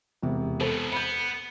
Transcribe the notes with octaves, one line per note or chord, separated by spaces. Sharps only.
E1 C3
E2 B2 A4 C5
B3 B5 G6